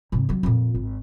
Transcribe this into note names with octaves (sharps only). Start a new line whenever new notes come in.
G#2 C3
D#3 F#3
F2 A#2
G#1